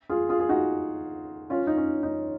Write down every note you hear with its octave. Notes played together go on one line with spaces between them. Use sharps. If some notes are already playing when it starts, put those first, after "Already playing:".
F4 G#4
F4 G#4
G#4
D#4 F#4
C#4 F4
D#4
C#4
D#4